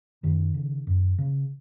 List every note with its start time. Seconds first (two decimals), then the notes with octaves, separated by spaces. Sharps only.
0.23 F#2 D#3
0.54 C#3
0.87 F#2
1.18 C#3